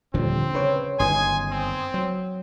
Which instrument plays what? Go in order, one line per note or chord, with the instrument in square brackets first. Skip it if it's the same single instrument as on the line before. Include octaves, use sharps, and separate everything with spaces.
[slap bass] D#1 A#2 F3 [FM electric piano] D3 G3 [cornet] C4
[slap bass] C#3 [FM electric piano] B4 C#5
[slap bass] G1 F#2 D#3 [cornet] G#5 [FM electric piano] C6 D#6 G#6
[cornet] C4
[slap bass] F#3